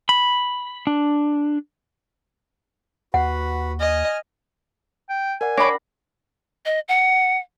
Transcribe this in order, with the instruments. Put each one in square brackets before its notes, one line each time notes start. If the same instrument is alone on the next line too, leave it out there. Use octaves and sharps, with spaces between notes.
[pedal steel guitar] B5
D4
[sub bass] D#2 [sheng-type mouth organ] F#4 B4 [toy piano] F#5
[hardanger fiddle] D#5 [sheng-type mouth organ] G#5 F6
[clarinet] G5
[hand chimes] A#4 D5 F#5 [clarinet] G#5
[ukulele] D4 G5 B5 [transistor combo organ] C#5 D6 [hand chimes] A#6
[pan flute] D#5
F#5